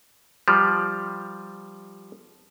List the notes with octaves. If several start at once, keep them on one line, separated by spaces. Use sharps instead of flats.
F3 G3